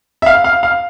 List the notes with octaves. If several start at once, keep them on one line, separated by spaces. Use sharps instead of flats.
E5
F5
F5
F5